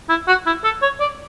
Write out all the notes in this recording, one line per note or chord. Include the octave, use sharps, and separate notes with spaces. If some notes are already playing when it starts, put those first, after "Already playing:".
E4
F#4
E4
A4
C#5
D5